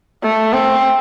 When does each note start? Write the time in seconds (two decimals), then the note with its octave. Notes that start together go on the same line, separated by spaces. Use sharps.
0.22 A3
0.53 C4